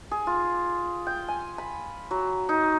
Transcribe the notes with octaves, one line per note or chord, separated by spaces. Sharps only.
G#4
F4
G5
G#5
B5
F#3
D#4